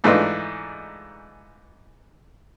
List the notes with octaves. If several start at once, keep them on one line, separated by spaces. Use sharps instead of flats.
G#2 E3 A3 D4 D#4 F4